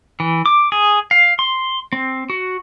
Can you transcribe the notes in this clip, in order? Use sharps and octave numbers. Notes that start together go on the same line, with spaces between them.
E3
D6
G#4
F5
C6
C4
F#4